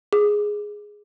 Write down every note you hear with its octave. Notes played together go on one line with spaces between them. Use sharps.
G#4